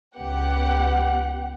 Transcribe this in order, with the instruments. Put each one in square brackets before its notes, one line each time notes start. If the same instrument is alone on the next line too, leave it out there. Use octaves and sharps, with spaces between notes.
[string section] C#2 B3 G4 F#5